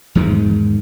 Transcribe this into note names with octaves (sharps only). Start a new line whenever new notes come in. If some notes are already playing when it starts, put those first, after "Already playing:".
E2 G#2 D#3 G#3